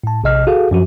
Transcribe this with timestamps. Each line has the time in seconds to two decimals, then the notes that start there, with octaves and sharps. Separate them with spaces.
0.04 A2 A5
0.24 A#1 C3 D#5 F6
0.47 F#4 G#4 A4 F5
0.71 F#2 F3 F#4